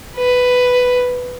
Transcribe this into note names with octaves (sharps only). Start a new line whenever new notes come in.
B4